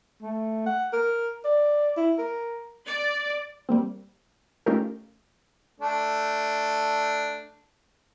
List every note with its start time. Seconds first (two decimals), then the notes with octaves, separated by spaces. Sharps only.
0.22 A3
0.66 F#5
0.93 A#4
1.45 D5
1.97 E4
2.19 A#4
2.86 D5
3.69 G3 A#3 C4
4.66 A3 C#4 D#4 F4 G4 A#4
5.80 A3 D4